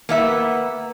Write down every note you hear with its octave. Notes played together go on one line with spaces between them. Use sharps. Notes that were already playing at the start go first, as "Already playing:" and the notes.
A#3 B3 E5